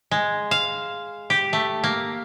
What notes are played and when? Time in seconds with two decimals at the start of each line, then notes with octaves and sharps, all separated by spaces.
0.11 G#3
0.51 F5
1.30 G4
1.53 A3
1.84 A#3